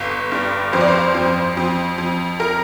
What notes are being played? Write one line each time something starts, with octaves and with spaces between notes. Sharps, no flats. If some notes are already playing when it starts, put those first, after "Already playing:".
Already playing: G1
G2
F2 C5
D5
C5
F2
F2
F2
A#4